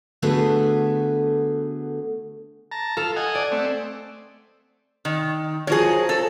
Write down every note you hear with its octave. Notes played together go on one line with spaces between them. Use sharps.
D3 A3 B3 F#4 G#4 B4
A5 A#5
F4 A4 F6
D#5 F#5 G#5
D5
A3 C4
D#3
F3 F#3 G#4 A#4 C#5
A4